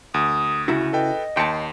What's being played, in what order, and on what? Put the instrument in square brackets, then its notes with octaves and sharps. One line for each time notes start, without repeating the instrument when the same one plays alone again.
[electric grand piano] D2 [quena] D#6
[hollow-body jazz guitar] C#3 E4 F#4
[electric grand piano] A4 B4 G5 [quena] D#5
[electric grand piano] D#2 C6 C#7 [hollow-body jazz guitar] G5 A5